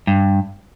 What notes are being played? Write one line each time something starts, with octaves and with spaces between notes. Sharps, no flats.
G2